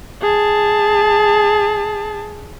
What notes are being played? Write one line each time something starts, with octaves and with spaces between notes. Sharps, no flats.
G#4 A5